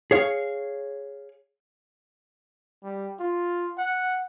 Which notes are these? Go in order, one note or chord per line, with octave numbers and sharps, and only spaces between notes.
G#4 C#5 F5
G3
F4
F#5